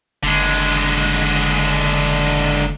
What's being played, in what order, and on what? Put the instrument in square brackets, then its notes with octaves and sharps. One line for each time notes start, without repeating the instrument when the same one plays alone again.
[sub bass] F#1 [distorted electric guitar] D3 G#3